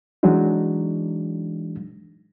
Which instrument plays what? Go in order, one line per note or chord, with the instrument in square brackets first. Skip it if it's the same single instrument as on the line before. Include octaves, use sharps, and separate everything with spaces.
[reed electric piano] E3 F#3 G#3 D4 D#4